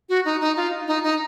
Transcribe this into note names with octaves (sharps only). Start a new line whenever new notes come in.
F#4
D#4
D#4
F4
D#4
D#4